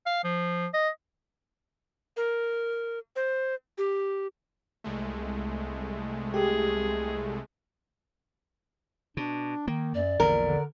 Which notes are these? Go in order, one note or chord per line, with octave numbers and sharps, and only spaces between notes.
F5
F3
D#5
A#4
C5
G4
C2 G#3 A3
G4 G#4
B2 D4
D#3 A#3
F#2 D5
A#1 E2 A#2 D3 A#4
D3